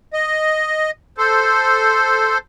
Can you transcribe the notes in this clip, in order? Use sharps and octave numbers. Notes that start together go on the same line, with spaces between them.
D#5
A4 C5